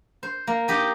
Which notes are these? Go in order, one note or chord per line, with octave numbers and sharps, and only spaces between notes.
C5
A#3
D#4 G4 D#5